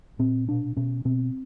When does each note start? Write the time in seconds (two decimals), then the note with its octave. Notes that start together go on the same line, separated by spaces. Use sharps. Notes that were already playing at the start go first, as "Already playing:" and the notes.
0.19 A#2 C4
0.48 B2 D4
0.77 B2 C#4
1.05 B2 C4